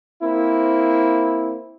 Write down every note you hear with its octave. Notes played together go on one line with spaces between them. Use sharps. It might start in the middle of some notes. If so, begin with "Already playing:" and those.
A#3 C4 E4